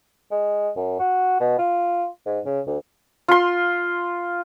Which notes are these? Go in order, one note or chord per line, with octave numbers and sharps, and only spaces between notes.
G#3
F#2
F#4
B2
F4
G#2
C#3
D2
F4 C6